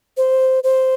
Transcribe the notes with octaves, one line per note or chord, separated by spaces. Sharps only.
C5
C5